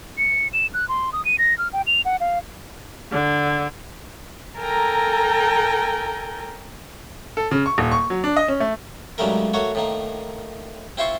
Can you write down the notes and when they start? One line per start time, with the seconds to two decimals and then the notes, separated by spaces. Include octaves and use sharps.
0.18 C#7
0.53 E7
0.74 F#6
0.89 C6
1.13 D#6
1.25 D#7
1.39 A#6
1.58 F6
1.73 G5
1.87 F7
2.05 F#5
2.20 F5
3.12 D3
4.57 A4 A#4 G5 G#5 A#5
7.37 A4
7.51 C#3
7.66 C#6
7.78 D#1
7.92 C#6
8.10 F#3
8.24 D4
8.36 D#5
8.48 C#4
8.60 A3
9.18 G#2 C#3 F#3 G3 A3 A#4
9.53 A3 A#3 F#4 C#5
9.75 A2 D#3 A#3
10.97 C4 E4 F4 C5 C#6